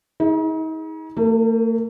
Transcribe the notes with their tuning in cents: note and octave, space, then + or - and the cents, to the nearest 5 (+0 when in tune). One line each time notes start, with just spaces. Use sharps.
D#4 +40 G#4 +0
A3 +45 A#4 +0